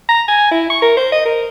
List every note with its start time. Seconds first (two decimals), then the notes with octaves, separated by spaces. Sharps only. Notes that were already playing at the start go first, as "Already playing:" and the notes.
0.09 A#5
0.28 G#5
0.51 E4
0.70 C#6
0.82 A#4
0.97 C5
1.12 D#5
1.26 A#4